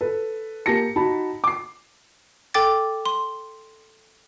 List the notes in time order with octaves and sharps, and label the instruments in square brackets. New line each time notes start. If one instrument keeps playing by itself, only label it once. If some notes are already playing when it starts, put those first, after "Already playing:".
[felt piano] A4 B4
A#3 G4 A5 A#6 C#7
D#4 F#4 A5 B5
D6 C7
[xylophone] A4 G5 D6 A6
C6